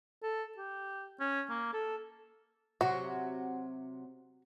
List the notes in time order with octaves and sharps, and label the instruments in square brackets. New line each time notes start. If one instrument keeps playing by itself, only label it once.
[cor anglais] A4
G4
C#4
A#3
A4
[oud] C3 F#3 [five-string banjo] F#4